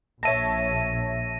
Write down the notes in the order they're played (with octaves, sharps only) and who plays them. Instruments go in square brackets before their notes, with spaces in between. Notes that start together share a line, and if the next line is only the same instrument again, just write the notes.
[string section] A#1 [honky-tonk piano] C#5 E5 A5 [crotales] A#6 D#7